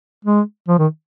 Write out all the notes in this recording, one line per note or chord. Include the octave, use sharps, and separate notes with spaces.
G#3
F3
D#3